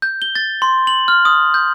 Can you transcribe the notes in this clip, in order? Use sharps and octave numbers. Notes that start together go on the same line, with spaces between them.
G6
G7
A6
C6
F#7
F6
D#6
G6